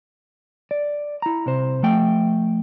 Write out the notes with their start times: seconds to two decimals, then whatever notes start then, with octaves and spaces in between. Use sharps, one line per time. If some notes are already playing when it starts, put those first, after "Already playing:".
0.71 D5
1.22 E4 A#5
1.46 C2 C3 C5
1.83 F3 A3 G5